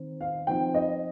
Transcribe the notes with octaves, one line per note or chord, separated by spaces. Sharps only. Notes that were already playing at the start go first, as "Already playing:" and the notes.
Already playing: D#3 C4
F5
F3 C4 D#4 G5
D#5